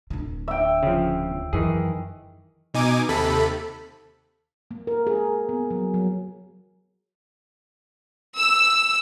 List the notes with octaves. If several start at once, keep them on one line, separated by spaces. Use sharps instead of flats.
D1 D3
E5 G5
C#3 F3
F#2 D#3 E3 G#4
B2 D#4 G#5 D6 D#7
D#2 C3 A4 B5
A#3
A#4
G#4
B3
F#3
F#3
E6